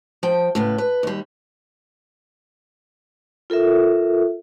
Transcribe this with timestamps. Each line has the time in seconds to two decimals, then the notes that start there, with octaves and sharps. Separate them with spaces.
0.23 F3 G5
0.55 A2 C#3 B3
0.78 B4
1.03 D#2 G3
3.50 F4 A4 A#4 E5